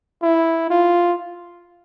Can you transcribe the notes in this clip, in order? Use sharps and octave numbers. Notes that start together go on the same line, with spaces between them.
E4
F4